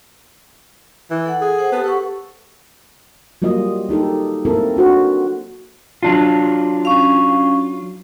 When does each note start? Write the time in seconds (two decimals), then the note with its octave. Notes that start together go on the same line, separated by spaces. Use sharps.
1.10 E3
1.26 A4 F#5
1.41 G#4
1.58 C5 F#5
1.72 B3 G4 A4 A5
1.84 A4 B4 F#5 C#6
3.42 F#3 G3 A#3 F4 D#5
3.89 A#3 D#4 G4 A4
4.45 A#3 C4 E4 A4 A#4
4.77 D4 F#4 C5
6.03 F#3 D4 F4
6.85 C#4 F5